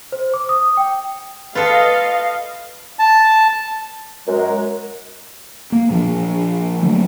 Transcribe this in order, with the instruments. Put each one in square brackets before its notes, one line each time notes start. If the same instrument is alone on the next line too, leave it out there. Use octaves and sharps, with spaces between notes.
[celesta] C5
D6
D#6
G5
[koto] F4 A4 [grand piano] B4 [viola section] D#5 F5
[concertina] A5
[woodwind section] F#2 G#3 [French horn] A#4
[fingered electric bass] A#3
A#2 F3 C4 D4
D3 F#3 A3 A#3